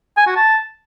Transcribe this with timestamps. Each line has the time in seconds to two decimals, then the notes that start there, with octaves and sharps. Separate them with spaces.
0.17 G#5
0.27 F#4
0.36 A5